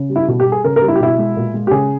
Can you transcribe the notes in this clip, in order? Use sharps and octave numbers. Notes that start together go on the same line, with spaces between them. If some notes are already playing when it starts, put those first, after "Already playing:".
Already playing: C#3
G3
E4
B2
G4
G3
G#4
C#3 A#4
A#4
G3
E4
G4
B2 E4
G#3
A#2
G#3
G4
C#3 G#4